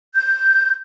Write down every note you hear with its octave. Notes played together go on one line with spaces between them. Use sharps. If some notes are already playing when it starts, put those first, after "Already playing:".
G6